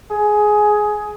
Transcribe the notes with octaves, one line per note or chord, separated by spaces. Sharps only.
G#4